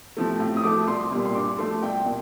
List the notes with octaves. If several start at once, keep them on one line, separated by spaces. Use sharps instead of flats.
C3 F3 A3
A2
D#6
F3 A3 D6
C2 C6
A#2 G3
C6
G2 D6
F3 A3 C6
C2 G5
A#2